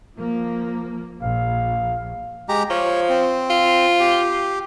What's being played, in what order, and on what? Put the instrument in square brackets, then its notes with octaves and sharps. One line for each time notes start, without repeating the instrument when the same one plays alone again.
[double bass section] F3 A#3
[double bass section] A#1 [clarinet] F5
[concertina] G#3 G4 A#5
[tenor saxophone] F3 [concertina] C#5
[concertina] C4
[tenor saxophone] F4
[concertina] G4